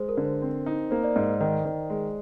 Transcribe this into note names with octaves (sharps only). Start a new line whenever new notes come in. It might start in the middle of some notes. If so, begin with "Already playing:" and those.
Already playing: G#3 C5
A#4
D3
C5
C4
D#4
A#3 C5
D5
G#2 D#5
D#5
D#3 D#5
D#3
G#3